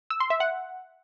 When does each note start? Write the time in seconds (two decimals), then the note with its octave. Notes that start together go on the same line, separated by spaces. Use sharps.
0.10 E6
0.20 C6
0.30 E5
0.40 F#5